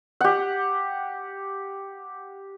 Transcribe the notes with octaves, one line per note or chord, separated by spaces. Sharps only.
G4 F#5